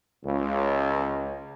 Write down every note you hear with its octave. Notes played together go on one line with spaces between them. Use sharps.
C#2